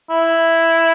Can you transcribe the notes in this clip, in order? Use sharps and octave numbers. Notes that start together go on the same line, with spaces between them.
E4